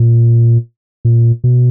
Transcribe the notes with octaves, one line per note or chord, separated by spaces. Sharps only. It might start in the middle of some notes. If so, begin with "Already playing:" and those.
Already playing: A#2
A#2
B2